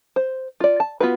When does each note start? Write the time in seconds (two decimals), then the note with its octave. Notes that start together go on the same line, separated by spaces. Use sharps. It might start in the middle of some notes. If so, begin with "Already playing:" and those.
0.16 C5
0.60 F4 D5
0.80 A5
1.00 B3 F4 F#4 B4